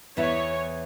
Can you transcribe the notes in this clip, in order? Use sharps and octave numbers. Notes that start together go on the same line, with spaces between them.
E2 E3 B3 E4 C#5